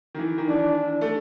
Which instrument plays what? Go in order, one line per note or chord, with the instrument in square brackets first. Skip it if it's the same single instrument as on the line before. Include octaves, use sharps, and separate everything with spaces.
[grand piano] D#3
E3
D#3
[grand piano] E3 [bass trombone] D4
[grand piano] A3